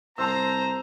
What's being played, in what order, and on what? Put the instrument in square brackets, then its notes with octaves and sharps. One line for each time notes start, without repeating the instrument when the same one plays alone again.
[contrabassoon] C2 [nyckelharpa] C5 [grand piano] A5 C6 E6 [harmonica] A#5